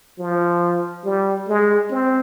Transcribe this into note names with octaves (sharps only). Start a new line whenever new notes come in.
F3
G3
G#3
C4